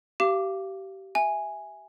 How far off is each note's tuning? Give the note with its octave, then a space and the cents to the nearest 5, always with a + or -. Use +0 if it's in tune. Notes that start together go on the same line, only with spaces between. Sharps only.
G4 -25 F5 -25 D6 +0
E5 +0 G#5 +0